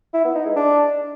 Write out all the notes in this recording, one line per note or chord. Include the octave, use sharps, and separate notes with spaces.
E4
B3
D#4
G#3
D4